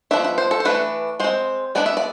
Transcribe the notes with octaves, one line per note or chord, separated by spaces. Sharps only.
F3 B3 D4 E5
E5
C5
A4
C5
E3 A3 D4 B4
G#3 C4 C5
G#3 B3 D4 D5
E5
D5